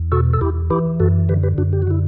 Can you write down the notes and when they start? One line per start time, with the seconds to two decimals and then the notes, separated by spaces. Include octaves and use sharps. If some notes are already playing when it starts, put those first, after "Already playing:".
Already playing: E2
0.12 B2 F#4 A4
0.33 A4
0.41 E2 E4 G4
0.70 E3 E4 G4
1.00 F#2 F#4 A4
1.29 D3 G4 B4
1.43 G4 B4
1.58 F#2 D4 F#4
1.73 G4
1.82 F#4
1.87 D3 E4